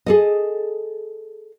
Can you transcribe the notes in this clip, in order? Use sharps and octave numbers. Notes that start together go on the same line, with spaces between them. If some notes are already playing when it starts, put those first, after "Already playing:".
G#4 A4 D#5